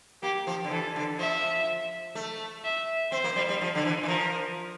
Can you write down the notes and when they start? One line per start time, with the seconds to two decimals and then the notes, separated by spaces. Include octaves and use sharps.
0.23 A#3 G4
0.47 F3
0.64 D3
0.71 E3 A4
0.96 D3
1.19 F3 E5
2.15 A3
2.64 E5
3.12 C4 C5
3.24 A#3
3.36 G3
3.49 G3
3.61 F3
3.75 D3
3.85 E3
4.03 E3
4.08 F3 A#4